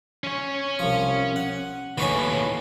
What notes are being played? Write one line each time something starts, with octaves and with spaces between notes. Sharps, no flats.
C#4 C#5
C2 F3
F#5
D#2 A2 B4 C#5 G#5